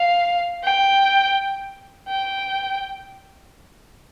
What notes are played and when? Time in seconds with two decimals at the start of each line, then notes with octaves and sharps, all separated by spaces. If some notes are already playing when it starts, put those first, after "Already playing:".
Already playing: F5
0.64 G5
2.09 G5